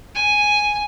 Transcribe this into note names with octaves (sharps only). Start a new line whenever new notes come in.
G#5